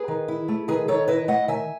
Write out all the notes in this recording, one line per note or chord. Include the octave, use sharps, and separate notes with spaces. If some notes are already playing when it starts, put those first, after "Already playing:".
Already playing: G#4 B4
D#3
E4
A3
D#3 G#4 B4
D#3 A4 C#5
E4 B4 D#5
A3 D#5 F#5
D#3 E5 G#5